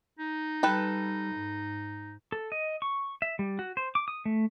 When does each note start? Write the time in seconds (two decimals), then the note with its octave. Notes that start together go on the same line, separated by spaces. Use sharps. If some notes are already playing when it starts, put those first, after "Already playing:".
0.19 D#4
0.63 G3 A4 B4 G5
1.34 G#2
2.32 A4
2.52 D#5
2.82 C#6
3.22 E5
3.39 G3
3.59 F#4
3.77 C5
3.95 D6
4.08 D#6
4.25 A3